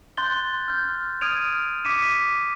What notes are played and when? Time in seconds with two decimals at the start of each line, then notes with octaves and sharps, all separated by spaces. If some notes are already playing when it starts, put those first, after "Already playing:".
0.17 C6 F#6 G6 A6 G7
0.68 F6 G6
1.21 D#6 F6 G#6 D7 D#7 F7
1.85 D6 B6 C#7 D#7 E7
2.02 B6